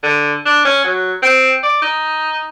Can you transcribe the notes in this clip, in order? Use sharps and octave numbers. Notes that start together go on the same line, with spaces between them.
D3
D4
C#4
F#3
C4
D5
D#4